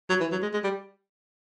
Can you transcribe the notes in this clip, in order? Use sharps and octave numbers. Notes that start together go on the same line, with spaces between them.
F#3
E3
F#3
G#3
G#3
G3